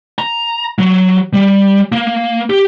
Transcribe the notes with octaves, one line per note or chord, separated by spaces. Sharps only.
A#5
F#3
G3
A#3
G4